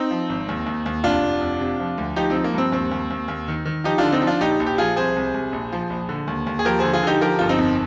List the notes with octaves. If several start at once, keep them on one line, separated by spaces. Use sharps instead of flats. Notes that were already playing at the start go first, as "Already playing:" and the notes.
Already playing: C4 D#4
F3
G#1
D#2
D#2
D#2
F1 D4 F4
F1
F2
C3
F3
D2
F3 D#4 G4
F3 C4 D#4
A#3
G2 C4
D#2 C4
D#2
D#2
D#2
D#3
D#3
F3 D#4 G4
D3 D4 F4
C4 D#4
F3
D4 F4
A#1 D#4 G4
A#1
G4
F3 F4 G#4
C2 G#4 C5
C2
C2
A#1
F3
A#1
D3
D#2
D#2
G#4
F3 G4 A#4
D3 G#4 C5
F4 G#4
D3 D#4 G4
F3 G4 A#4
G1 F4
C4 D#4
F2